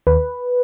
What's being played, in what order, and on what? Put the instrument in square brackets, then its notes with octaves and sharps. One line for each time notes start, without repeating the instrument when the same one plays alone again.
[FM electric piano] D#2 B4